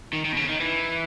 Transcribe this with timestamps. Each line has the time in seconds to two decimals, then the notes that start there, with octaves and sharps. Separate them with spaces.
0.13 D#3
0.25 D#3
0.33 B2
0.37 C#3
0.49 D#3
0.61 E3